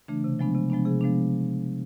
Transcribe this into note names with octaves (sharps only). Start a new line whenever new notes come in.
C#3 E3 A3 D4
C3
F3 G#3 B3 D4
C3
F3 G#3 B3 D4
C3 G#4
F3 G#3 B3 D4